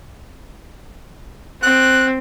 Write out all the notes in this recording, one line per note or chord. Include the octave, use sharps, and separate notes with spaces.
C4 F#6